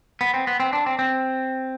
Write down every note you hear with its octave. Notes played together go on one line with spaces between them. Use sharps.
B3
C4
B3
C4
D4
C4
C4